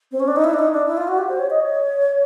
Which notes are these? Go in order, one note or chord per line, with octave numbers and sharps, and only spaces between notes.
C4
C#4
D4
D#4
E4
D4
D#4
D4
E4
F4
F#4
G4
C5
C#5
D#5
C#5